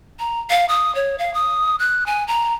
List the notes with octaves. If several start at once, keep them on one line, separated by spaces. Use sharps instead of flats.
A#5
F5
D#6
C#5
F5
D#6
F#6
G#5
A#5